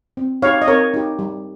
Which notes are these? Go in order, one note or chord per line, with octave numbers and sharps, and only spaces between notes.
C4
D#4 G4 C#5 F5
D#5
C4 A#4 C#5
D#4 G4
G3